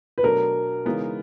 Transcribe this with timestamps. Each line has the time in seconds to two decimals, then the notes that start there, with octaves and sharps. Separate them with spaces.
0.18 B4
0.23 B2 F#3 A3 D4 A#4
0.85 C#3 E3 G#3 B3 D#4